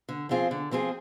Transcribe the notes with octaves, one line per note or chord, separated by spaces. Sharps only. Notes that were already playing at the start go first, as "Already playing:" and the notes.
D3
F3 C4 F4 G#4
D3
F3 C4 F4 G#4